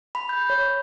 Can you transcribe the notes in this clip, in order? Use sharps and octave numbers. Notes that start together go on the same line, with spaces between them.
B5
G6
C#5